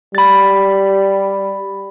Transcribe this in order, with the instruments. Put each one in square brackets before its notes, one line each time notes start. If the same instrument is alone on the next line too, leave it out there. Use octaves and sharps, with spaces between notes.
[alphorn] G3 [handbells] B5 A6